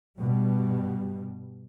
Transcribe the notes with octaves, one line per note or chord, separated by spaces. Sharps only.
G2 B2 G3